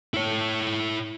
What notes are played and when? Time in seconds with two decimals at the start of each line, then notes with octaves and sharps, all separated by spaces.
0.14 E4 C#5